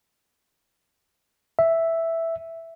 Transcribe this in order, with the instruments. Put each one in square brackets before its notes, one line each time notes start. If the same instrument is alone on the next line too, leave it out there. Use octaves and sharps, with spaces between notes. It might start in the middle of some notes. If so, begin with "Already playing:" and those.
[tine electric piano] E5